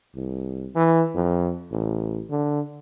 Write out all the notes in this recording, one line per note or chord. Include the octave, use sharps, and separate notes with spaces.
C2
E3
F2
A1
D3